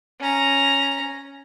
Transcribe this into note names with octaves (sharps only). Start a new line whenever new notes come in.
C#4 A#5